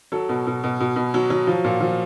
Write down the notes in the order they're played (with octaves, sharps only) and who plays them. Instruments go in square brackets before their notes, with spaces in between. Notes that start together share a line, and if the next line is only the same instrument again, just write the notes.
[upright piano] F#3 A4
B2
B2
B2
B2
B2
F#3
F#3
F3
A#2
F3